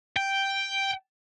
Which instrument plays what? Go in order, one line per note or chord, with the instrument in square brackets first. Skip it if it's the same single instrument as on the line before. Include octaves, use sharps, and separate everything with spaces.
[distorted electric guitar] G5